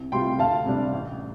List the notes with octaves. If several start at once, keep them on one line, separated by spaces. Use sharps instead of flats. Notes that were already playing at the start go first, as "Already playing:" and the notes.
Already playing: C2
C3 G3 F4 G5 C6
D2 F5 A5
C3 G3 D4
A1